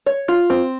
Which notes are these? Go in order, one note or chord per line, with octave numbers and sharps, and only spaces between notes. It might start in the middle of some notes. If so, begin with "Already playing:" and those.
C#5
F4
C4